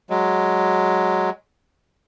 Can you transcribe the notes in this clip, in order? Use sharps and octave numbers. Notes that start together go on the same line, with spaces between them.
F#3 G#3